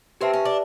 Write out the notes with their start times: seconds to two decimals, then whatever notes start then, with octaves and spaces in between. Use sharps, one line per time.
0.21 C4 G4 B4 E5 A5
0.33 C#4
0.45 D4